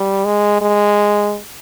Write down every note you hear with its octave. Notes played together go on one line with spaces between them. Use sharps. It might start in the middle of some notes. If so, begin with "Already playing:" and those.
Already playing: G3
G#3
G#3